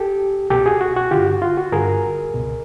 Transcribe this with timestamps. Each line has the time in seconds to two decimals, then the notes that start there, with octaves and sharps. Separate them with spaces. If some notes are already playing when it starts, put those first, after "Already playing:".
Already playing: G4 A4
0.50 C2 B2 G4 A4
0.66 F#4 G#4
0.81 F#4
0.97 F#4
1.11 G2 D3 F4 G4
1.26 F#4
1.42 F4
1.57 F#4
1.72 G2 D3 G#4 A#4
2.34 C#2 B2